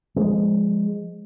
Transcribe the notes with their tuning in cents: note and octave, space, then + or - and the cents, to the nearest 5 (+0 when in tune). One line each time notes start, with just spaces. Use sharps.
F3 +0 G#3 -10